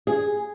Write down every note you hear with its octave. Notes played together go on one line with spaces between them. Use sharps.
G#4